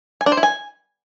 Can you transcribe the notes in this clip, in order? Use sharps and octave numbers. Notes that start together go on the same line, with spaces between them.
G#5
D4
C5
E4
G#5